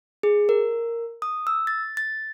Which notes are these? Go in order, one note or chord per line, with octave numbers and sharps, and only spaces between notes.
G#4
A#4
D#6
E6
A6
A6